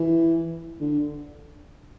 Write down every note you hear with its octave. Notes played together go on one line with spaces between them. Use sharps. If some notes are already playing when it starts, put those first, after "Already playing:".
Already playing: E3
D3